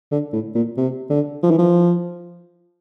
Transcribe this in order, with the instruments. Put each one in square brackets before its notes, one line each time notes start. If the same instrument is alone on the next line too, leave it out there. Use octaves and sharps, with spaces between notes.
[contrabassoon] D3
A2
A#2
C3
D3
F3
E3
F3